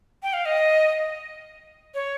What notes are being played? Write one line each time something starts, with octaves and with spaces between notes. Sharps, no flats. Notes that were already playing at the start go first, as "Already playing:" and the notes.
G5
F5
D#5
C#5